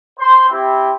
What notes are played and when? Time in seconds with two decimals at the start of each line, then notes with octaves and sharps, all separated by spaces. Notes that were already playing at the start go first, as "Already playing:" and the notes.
0.19 C5 C6
0.49 C4 E4 G4